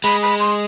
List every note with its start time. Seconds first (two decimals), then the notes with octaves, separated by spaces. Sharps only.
0.04 G#3 B5
0.22 B5
0.40 C6